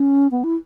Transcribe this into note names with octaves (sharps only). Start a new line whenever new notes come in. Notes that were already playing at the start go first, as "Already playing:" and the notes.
Already playing: C#4
B3
E4